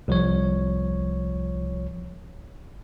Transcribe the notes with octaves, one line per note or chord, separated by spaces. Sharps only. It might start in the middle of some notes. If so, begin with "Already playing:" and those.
C2 F3 C#5